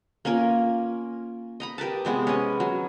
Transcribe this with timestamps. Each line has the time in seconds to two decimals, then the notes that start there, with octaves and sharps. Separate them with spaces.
0.25 A#3 C#4 F4 A#4
1.60 D#5 A#5 B5
1.78 G4 A#4 B4 A5
2.05 C3 G#3 B3
2.27 C#4 D#5
2.60 F#3